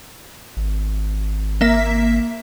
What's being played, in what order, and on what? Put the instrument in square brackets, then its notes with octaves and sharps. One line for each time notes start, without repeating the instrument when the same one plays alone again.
[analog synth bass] G#1
[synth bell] A#3 E5 B6